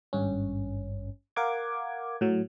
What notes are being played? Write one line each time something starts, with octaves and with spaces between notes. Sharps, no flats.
G#1 G2 C#4
A#4 F5 F#5 D6 G#6
A2 F#3